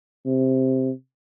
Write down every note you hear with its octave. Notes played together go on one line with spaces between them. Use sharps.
C3